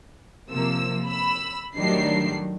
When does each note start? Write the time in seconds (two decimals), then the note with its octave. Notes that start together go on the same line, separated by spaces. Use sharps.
0.50 C3 F3 A#3 E6
1.06 B5 E6
1.78 A2 D#3 F#3 G3 D4 C7